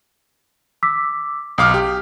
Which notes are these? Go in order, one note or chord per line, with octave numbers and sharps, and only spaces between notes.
D6 E6 B6
B1 F5 D6 D#6 F6
G4